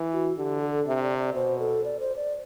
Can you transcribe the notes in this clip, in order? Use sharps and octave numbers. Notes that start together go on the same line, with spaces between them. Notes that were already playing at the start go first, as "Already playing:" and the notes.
Already playing: E3
F#4
D3 G4
A4
C3 E5
D5
D5
B2 C5
A4
D5
C5
D5